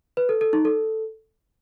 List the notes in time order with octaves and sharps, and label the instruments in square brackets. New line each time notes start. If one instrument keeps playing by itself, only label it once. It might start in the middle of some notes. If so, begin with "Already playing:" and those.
[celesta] B4
A4
A4
D#4
A4